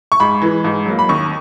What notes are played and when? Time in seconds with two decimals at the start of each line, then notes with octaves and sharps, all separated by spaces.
0.12 C#6
0.20 G#2 B5
0.42 E3 G#3
0.64 G#2
0.86 F#3 A#3
0.99 B5
1.09 D#2 C#6